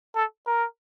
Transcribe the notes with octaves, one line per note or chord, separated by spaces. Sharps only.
A4
A#4